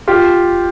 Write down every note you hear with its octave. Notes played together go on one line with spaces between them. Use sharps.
F4 G4